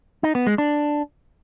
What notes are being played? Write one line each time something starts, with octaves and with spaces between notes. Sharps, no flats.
D#4
B3
G#3
D4